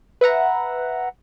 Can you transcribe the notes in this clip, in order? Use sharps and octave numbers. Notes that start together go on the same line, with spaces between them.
B4 E5 F#5 A#5